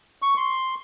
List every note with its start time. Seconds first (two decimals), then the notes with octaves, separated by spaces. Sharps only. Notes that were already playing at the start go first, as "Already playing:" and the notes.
0.22 C#6
0.37 C6